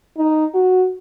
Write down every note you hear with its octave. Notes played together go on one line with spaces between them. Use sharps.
D#4
F#4